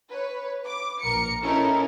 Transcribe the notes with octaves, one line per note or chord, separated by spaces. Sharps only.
B4 C#5
D6
A#1 A#4 C#7
C#4 D#4 E4 A4 A#4